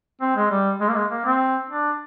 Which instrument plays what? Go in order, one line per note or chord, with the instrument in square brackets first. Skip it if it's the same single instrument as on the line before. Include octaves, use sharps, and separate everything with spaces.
[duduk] C4
G#3
G3
G#3
A#3
G#3
A#3
C4
D4